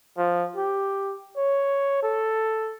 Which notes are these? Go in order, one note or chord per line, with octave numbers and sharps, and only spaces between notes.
F3
G4
C#5
A4